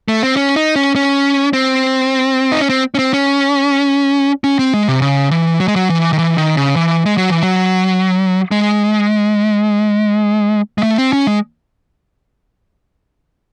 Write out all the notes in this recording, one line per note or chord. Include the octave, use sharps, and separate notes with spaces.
A3
C4
C#4
D#4
C#4
C#4
C4
D#4
C#4
C4
C#4
C4
C#4
C#4
C4
G#3
C3
C#3
E3
F#3
G#3
F#3
E3
D#3
E3
D#3
C#3
E3
G#3
F#3
E3
F#3
G#3
G#3
A3
C4
C#4
G#3